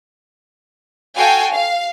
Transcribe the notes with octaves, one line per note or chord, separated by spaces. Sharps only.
F#4 A4 F5 G5 G#5
F5